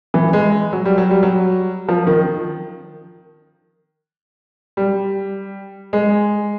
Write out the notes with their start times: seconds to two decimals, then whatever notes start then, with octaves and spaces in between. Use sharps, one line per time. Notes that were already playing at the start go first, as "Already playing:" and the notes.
0.14 E3
0.33 G#3
0.73 F#3
0.85 G3
0.98 F#3
1.11 G3
1.23 F#3
1.88 F3
2.07 D#3
4.77 G3
5.93 G#3